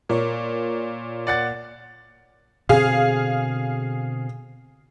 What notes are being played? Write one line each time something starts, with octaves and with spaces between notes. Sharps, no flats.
A#2 A#4 C#5 C#6
D5 F#5 A6
B2 D3 C4 G#4 F5